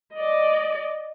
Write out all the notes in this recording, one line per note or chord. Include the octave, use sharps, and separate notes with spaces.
D5 D#5